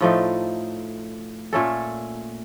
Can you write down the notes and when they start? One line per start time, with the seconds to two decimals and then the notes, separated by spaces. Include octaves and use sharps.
0.01 A2 F3 A3 D#4
1.53 A#2 A3 C#4 A4